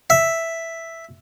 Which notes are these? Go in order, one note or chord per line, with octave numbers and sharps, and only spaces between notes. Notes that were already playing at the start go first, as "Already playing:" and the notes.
E5